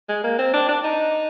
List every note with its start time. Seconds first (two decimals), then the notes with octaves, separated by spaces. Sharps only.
0.09 G#3
0.24 A#3
0.39 C4
0.53 D4
0.69 D4
0.84 D#4